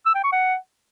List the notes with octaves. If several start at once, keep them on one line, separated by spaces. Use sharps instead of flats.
E6
G5
C#6
F#5